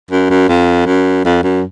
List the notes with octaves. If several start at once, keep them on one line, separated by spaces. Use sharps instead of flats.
F#2
F#2
F2
F#2
F2
F#2